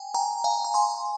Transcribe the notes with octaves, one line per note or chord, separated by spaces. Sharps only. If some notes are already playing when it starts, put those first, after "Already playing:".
Already playing: G5 G#5
G5 A#5
F5 G#5
A#5
G#5 C6